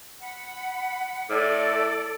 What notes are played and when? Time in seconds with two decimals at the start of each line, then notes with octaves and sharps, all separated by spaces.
0.20 F#5 B5
1.30 A2 A4 D5